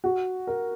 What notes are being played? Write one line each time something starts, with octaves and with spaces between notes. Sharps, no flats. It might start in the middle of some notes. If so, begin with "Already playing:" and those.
F#4
A#4